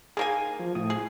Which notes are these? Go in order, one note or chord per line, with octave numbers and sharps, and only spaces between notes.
D#3 A#3 G#4 G#5
F3
A2 D#6
G#4